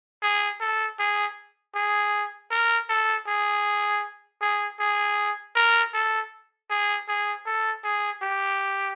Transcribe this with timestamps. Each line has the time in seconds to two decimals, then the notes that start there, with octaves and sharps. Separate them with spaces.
0.23 G#4
0.61 A4
0.99 G#4
1.75 G#4
2.51 A#4
2.89 A4
3.27 G#4
4.41 G#4
4.80 G#4
5.56 A#4
5.94 A4
6.70 G#4
7.08 G#4
7.46 A4
7.84 G#4
8.22 G4